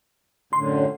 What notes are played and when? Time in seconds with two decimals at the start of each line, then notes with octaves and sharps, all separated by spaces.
0.53 F#2 A2 D3 C6